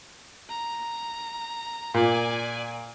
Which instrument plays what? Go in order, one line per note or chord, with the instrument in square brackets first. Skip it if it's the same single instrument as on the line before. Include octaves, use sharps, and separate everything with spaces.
[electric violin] A#5
[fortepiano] A#2 [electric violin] D5 G#5